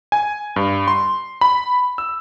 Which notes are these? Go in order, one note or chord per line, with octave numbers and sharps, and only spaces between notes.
G#5
G2
C6
B5
E6